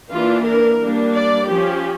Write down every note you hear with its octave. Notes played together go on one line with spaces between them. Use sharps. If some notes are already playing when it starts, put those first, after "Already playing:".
E3 A#3 D4 F4
A#4
G3 A#3 D4
D5
F3 C#4 G4